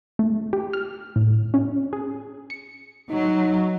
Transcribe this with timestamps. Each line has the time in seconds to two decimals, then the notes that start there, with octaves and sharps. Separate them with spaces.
0.19 A3
0.53 G4
0.73 F6
1.16 A2
1.54 C#4
1.93 G#4
2.50 C#7
3.10 F#3 D#4